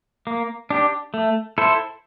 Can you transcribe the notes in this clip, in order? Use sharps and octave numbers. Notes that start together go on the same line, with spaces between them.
A#3
D4 G4
A3
E4 A4 C5